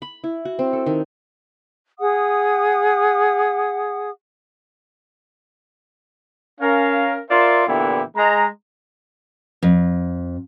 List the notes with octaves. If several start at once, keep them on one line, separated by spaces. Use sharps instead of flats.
B5
E4
F#4
C4
A4
D#3
G#4 F#5 D#6
C#4 A#4 F5
F4 A#4 C5 D5 E5 F5
A#2 D3 E3 B3 E4 G4
G#3 A#5
F2